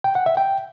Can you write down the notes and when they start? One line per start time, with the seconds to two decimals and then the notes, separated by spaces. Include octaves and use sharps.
0.04 G5
0.15 F#5
0.26 E5
0.37 G5